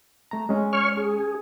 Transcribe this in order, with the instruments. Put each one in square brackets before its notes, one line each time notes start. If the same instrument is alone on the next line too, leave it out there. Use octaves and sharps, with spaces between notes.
[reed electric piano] A3 A#5
G#3 C#4
[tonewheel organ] C#5 C#6 F6
G#4